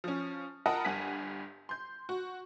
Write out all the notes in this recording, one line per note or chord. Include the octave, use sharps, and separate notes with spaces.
F3 C#4
F4 A#4 D#5 F#5 A5 B5
G1 G2 F#5 G#5 B6
C6 G6
F#4